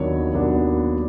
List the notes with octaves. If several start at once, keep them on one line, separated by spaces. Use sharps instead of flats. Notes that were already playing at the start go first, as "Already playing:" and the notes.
Already playing: D#2 D#3 F#3 B3 D4 C#5
D#2 D#3 F#3 B3 D4